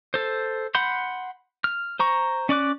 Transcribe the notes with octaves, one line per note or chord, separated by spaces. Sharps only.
A4 C5
F#5 B5 C6 G6
F6
C5 A#5 C#6
C#4 D5 D6 F#6